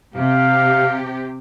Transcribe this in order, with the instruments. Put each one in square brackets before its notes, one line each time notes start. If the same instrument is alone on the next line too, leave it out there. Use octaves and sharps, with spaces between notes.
[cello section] C3 G4 [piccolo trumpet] F5